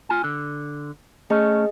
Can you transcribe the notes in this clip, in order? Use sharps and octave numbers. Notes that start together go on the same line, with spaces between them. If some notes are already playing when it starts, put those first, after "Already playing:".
F4 G#5
D3
A3 C#4 G#4 D#5